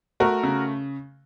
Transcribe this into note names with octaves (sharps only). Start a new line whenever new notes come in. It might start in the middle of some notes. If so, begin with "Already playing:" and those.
A3 F#4 A#4
C#3